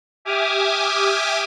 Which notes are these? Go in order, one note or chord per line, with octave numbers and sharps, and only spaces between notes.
G4 E5 G#5 D6 D#6 F6